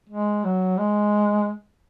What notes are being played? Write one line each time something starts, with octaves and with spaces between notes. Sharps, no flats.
G#3
F#3
G#3